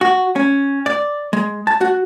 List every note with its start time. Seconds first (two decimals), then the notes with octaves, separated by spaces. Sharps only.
0.01 F#4
0.36 C#4
0.86 D5
1.33 G#3
1.67 A5
1.81 F#4